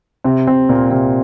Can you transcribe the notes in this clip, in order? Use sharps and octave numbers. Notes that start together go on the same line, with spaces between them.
C3 C4
C3 C4
A#2 A#3
C3 C4